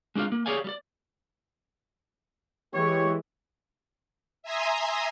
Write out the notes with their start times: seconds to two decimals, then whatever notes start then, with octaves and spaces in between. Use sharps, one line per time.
0.15 G#3 D4 D#4 F4 F5
0.32 A#3
0.46 G4 G#4 C#5 D5 F5 G#5
0.64 G3 D5
2.74 E3 G#3 G4 C#5
4.43 E5 G#5 A#5 C6 D#6